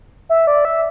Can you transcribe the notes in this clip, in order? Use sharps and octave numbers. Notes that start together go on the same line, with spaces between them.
E5
D5
E5